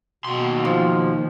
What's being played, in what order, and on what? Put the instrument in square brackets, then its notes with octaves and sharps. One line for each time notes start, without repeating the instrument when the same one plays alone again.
[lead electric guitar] D#2 C6 [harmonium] B2
[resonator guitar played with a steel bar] F3